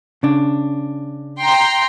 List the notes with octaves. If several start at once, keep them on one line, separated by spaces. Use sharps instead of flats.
C#3 D4
G5 A#5 C6